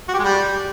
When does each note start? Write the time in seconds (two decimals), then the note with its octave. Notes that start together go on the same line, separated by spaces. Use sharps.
0.09 F#4
0.14 G4
0.19 G#3
0.24 G3